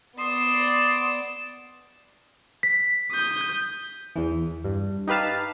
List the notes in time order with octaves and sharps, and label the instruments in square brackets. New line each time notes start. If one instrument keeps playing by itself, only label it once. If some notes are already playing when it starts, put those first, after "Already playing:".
[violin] B3 E7 [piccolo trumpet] D5 [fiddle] C6 [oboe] D#6
[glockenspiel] B6
[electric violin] D#6 G6
[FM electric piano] E2 E3
G2
D#4 G4 B4 F5 A5